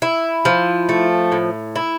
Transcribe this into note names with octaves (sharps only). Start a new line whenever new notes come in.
E4
F3
A3
A2
E4